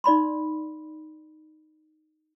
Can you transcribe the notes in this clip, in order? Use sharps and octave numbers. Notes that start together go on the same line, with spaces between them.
D#4 D5 B5 C6